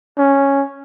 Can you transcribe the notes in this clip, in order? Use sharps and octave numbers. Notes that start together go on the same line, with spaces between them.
C#4